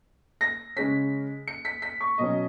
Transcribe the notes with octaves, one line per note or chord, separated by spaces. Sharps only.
A#6
C#3 G#3 C#4 B6
C#7
B6
B6
C#6
B2 F#3 C#4 D#5